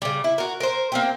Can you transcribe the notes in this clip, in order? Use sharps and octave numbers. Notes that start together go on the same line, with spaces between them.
C#3 G3
E4
F#4 A#4
A#4 C5
A#3 C4 G4